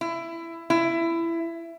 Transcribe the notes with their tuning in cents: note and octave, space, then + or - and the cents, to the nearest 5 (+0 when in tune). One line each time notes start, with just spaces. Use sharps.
E4 +20
E4 +20